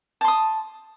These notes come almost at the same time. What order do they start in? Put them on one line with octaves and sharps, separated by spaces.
A5 C6 D#6